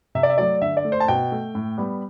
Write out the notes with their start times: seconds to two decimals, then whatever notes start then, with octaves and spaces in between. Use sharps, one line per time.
0.15 C3 E5
0.23 D5
0.30 E5
0.38 F#3 A3 D5
0.62 D3 E5
0.77 D5
0.85 A3
0.92 C5
1.00 A5
1.08 B2 G5
1.32 A3
1.55 A2
1.78 G3 B3